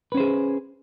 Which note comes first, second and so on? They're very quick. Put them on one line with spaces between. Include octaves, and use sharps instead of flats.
B4 C#4 C5 G#4